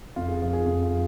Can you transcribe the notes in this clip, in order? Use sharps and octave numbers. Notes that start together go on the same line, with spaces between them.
F2 F4
G#4
F3 F4
G#4
F2 F4
F4
F3